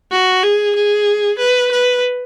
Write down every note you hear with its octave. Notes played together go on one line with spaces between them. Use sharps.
F#4
G#4
G#4
B4
B4